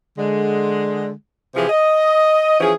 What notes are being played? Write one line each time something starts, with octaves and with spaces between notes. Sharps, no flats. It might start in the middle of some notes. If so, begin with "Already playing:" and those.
D3 G#3
C3 E3 F3 G4 G#4
D#5
E3 F3 C#4 G#4